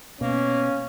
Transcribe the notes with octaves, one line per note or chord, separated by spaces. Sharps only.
B2 A#3 C#4